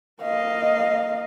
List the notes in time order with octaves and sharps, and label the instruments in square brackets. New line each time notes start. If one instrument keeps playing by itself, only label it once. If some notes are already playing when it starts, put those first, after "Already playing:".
[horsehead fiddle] A#3 D#5 [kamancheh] F5